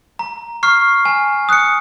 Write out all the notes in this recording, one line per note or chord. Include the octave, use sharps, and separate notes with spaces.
A#5
C#6 F6 C7
G#5
D#6 F#6 C#7